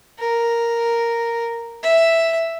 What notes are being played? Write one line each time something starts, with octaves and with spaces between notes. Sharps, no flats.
A#4
E5